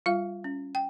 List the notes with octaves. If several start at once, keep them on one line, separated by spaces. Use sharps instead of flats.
G3 F4 F5
C#4
G5